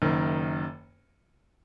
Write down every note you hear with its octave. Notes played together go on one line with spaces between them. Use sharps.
F#1 F#2 D#3